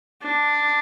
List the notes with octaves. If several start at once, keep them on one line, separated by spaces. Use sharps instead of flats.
D4